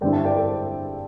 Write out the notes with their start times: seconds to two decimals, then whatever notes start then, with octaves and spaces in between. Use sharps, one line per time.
0.01 G2 D3 C4 E4 D5 G5
0.13 E5 A5
0.25 D5 G5
0.37 A4 D5
0.49 C5